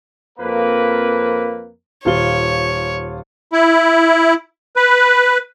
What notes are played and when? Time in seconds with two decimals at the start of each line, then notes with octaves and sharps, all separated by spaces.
0.39 F2 A#3 B4
2.05 D#1 F4 C#5 G7
3.53 E4
4.76 B4